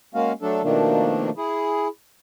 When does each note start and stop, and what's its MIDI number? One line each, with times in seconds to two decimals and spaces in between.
0.14 0.32 56
0.14 0.32 58
0.14 0.32 61
0.14 0.32 66
0.14 0.32 77
0.42 0.62 54
0.42 0.62 57
0.42 0.62 62
0.42 0.62 69
0.63 1.30 47
0.63 1.30 51
0.63 1.30 53
0.63 1.30 57
0.63 1.30 58
0.63 1.30 62
1.37 1.88 64
1.37 1.88 68